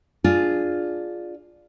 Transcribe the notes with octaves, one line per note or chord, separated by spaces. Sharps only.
D4 F4 G#4